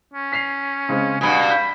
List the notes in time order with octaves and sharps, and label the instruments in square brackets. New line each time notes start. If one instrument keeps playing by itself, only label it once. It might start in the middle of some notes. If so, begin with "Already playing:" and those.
[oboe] C#4
[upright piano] B6 C7 F7
C#3 G#3 C4
[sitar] G2 B2 [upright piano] F#5 B5 D#6 [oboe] G#5
[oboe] B5 [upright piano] G6